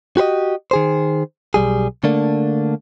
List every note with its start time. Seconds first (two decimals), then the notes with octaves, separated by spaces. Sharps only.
0.17 F#4 G4 C5 D#5
0.71 D#3 G#4 C5
1.54 B1 E2 G3 G#4
2.04 D3 A3 A#3 D4